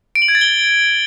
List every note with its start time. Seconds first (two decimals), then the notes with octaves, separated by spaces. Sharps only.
0.15 D7
0.22 F#7
0.28 G#6
0.35 A6
0.41 G7